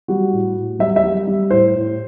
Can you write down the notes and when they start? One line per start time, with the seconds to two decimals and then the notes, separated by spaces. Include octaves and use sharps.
0.08 G3 F#4
0.32 A2
0.56 A2
0.79 G3 E5
0.96 E5
1.03 G3
1.27 G3
1.51 A2 C5
1.75 A2